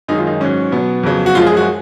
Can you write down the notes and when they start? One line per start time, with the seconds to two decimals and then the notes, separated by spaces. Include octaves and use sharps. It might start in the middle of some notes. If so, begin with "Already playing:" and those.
0.08 F#2 D#3 G#3 D#4
0.18 F4
0.27 D#4
0.41 G#2 F#3 C#4
0.72 B2 F#3 B3
1.03 F2 C#3 F#3
1.26 F#4
1.35 F#2 F3 G#3 F4
1.47 G#4
1.57 F#4